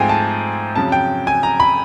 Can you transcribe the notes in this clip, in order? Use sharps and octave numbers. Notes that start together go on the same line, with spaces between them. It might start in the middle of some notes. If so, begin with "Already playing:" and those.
Already playing: G#2 F3 A3 C4 G5 G#5
A5
F2 C#3 F#3 A5
G5
G#5
A#5
B5